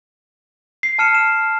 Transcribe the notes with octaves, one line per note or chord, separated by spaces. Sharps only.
C7
A5 F6 C#7 E7
E7